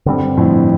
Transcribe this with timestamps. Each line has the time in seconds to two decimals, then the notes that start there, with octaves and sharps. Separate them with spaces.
0.06 G2 D3 G3 C4
0.22 G2
0.37 F2 A2